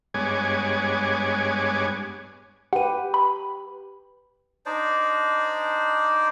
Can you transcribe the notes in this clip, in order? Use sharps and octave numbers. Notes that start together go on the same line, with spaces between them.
G2 G#3 B3 C#5 G#5 D6
G4 B4 F#5 D#7
B5
D4 D#4 C5 D5